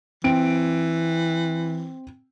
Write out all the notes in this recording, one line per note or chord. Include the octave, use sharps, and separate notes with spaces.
E3 C4 D7